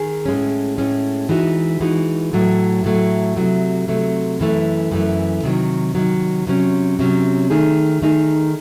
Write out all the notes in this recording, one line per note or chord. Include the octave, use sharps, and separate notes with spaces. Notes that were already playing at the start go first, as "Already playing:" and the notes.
Already playing: D#3 G#4
A2 G#3 C#4
A2 G#3 C#4
E3 G#3 D#4 F#4
E3 G#3 D#4 F#4
A2 F#3 A3
A2 F#3 A3
C3 F#3 A3
C3 F#3 A3
F#2 E3 A3
F#2 E3 A3
C3 D#3 F#3
C3 D#3 F#3
C3 F#3 C#4
C3 F#3 C#4
D#3 A3 D#4 G#4
D#3 A3 D#4 G#4